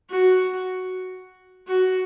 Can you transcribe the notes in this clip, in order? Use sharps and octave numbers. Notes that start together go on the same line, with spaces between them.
F#4
F#4